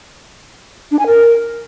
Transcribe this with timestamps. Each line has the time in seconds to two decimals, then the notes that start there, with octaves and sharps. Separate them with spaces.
0.91 D4
0.99 G#5
1.07 A#4